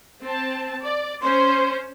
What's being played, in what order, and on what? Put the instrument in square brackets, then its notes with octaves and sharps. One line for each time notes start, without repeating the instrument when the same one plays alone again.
[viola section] C4 A5
D5
[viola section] C#4 C5 [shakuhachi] C6